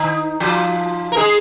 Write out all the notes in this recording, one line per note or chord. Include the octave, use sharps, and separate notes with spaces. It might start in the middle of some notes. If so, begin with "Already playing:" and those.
Already playing: D#3 D#4
F3 F4
A#4
G#3 G#4